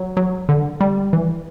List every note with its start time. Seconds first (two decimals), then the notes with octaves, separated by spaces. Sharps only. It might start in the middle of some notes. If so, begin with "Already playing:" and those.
Already playing: F#3
0.17 F#3
0.49 D3
0.81 G3
1.13 E3